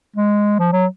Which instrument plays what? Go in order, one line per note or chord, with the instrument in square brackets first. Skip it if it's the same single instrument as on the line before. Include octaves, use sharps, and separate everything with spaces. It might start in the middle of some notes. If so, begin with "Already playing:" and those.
[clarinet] G#3
F3
F#3